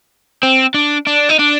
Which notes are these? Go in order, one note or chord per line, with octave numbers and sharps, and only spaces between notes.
C4
D4
D4
D#4
D4